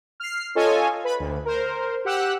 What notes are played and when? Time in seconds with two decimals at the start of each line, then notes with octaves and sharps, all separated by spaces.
0.20 F6 C7
0.55 C#4 F4 A4 C#5 D#5 G#5
1.04 B4 B5
1.19 D2
1.45 A#4 C5
2.05 G4 F#5 E6 F#6